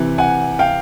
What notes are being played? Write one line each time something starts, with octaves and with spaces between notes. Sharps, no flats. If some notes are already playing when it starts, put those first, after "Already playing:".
Already playing: C3 E3
F#5 G#5
F5 G5